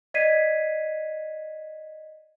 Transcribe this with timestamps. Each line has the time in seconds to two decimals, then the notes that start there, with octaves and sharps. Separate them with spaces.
0.14 D5 D#5 G#6 B6 C7 D#7